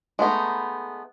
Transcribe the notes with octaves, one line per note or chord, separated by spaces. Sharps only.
G#3 A3 B3 D#4